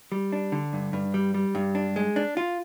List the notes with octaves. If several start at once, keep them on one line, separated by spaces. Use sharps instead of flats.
G3
D4
D3
G2
G2
G3
G3
G2
D4
G#3
D4
F4